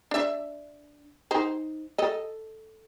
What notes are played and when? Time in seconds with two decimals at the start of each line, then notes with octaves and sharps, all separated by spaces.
0.11 D4 E5
1.31 D#4 C5
1.98 A4 D#5